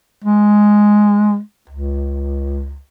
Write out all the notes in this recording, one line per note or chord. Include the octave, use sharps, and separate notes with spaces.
G#3
C#2